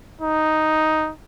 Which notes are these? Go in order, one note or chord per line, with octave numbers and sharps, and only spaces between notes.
D#4